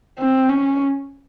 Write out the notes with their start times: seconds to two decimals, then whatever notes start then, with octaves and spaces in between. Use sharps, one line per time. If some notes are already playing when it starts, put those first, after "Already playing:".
0.19 C4
0.49 C#4